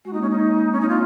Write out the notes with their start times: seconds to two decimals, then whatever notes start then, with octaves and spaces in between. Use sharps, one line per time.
0.05 G#3 F#4
0.13 A#3 D#4
0.22 G#3 C#4
0.30 D#4
0.66 C4
0.72 A#3 C#4
0.81 D#4
0.89 F4